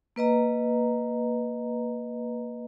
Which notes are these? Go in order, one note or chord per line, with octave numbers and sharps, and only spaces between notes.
A#3 B4 D#5 A#5